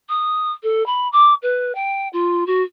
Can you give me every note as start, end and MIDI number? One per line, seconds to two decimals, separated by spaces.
0.09 0.52 87
0.63 0.85 69
0.86 1.08 83
1.12 1.34 86
1.42 1.72 71
1.75 2.08 79
2.13 2.46 65
2.46 2.63 66